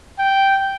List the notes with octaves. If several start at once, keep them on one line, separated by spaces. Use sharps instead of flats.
G5